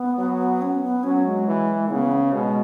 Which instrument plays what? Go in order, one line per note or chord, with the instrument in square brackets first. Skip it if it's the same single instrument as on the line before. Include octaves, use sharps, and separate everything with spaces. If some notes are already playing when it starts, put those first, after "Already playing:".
Already playing: [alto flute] B3
[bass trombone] F#3
[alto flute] C#4
B3
[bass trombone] F#3 [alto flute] C#4
[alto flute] G#3
[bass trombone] E3
[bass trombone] C#3 [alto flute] B3
[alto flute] C#4
[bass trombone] B2 [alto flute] G#3